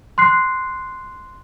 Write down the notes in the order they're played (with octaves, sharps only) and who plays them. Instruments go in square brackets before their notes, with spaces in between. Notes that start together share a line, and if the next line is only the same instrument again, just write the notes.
[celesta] C6 F#6 C7